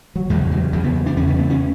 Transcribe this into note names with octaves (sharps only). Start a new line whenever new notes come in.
F#3
E2 C#3 G#3
F#3
E2 C#3 F#3
B3
D4
E2 C#3 C#4
B3
A3
C#4